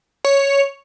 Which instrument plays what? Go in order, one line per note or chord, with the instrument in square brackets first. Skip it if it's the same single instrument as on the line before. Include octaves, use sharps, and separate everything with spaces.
[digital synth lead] C#5